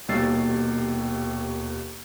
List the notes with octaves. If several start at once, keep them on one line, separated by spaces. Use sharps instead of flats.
D#1 D#2 B2 E6 A6 C7